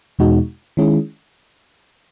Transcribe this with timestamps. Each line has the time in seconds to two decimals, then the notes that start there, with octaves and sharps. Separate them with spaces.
0.19 E2 B2 G#3 D#4 F#4
0.77 D#3 G#3 C#4 E4 G#4